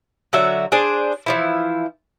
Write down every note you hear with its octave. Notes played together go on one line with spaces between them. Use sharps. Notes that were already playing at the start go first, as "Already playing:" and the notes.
D3 F#3 F#4 E5
D4 G#4 C5
E3 F3 E4